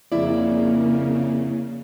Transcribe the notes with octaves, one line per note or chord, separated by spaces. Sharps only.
F2 C#3 A#3 E4 D5